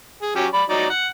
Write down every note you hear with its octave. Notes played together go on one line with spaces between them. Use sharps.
G#4
F#3 C#4 G4
D5 B5
F#3 D#4 D5
F#5